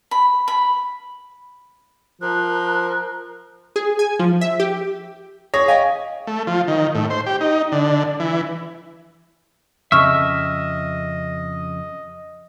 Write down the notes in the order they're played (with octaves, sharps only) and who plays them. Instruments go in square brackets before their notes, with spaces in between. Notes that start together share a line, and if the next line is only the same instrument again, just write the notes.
[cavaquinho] B5
B5
[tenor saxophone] F3 [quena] A#4 [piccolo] F#6
[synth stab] G#4
G#5
F3
E5
G4
[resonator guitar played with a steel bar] G#4 [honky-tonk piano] C#5 [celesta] A#6
[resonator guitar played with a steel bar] D#5 G5 G#5 [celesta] F5
[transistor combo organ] A3
F3
D#3
A2
C5
G4
D#4
D3
E3
[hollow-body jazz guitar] F2 C#3 [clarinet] D#5 [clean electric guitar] E5 [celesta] C#6 F6